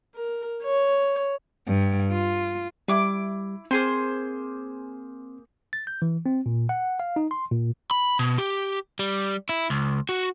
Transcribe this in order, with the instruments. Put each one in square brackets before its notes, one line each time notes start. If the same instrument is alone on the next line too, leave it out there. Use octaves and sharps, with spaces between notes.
[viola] A#4
C#5
[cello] G2
F4
[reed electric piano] G3 [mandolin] E4 D6
[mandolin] A#3 G#4 C5 [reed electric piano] C4
[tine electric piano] A6
G6
E3
C4
A#2
F#5
F5
D#4
C6
A#2
[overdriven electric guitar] B5
B2
G4
G3
E4
C#2
F#4